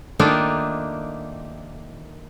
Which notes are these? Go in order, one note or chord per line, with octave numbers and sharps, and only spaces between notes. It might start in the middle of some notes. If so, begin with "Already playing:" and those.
D#3 A3 A#3 D4 D#4 F4